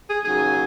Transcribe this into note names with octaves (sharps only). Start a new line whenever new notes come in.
G#4
D#2 C#3 F#3 G#4